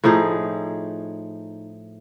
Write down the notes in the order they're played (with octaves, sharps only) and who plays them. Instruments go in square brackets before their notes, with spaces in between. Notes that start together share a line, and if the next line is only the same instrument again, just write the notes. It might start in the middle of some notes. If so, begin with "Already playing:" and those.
[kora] A2 F3 D#4 G#4